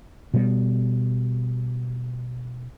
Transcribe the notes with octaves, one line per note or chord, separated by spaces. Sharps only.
B2 G3